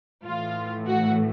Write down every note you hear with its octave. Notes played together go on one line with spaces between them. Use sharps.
A2 E3 A3 F4
F#4